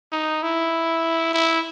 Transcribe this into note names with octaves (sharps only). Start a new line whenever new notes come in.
D#4
E4
E4